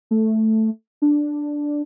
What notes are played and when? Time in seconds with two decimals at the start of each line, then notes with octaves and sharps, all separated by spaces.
0.11 A3
1.02 D4